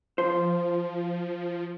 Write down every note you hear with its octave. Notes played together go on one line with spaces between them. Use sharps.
F3 C5